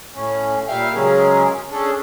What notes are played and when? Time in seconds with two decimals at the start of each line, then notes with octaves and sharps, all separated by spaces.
0.15 A2 C#4
0.68 A#2 G3 E5 F5 G5 F6
0.94 C#3 F#3 G#3 C#4 G#4 A#4
1.72 C#4 D4 G#4 A4